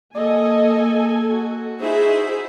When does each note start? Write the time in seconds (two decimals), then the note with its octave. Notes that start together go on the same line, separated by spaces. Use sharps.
0.15 A#3 A4 D#5 G#5
1.32 F#4
1.80 D#4 E4 G#4 C5 E5